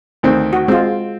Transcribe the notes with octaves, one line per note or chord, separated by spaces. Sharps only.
D2 D#3 C4
F#4
G#3 C4 F4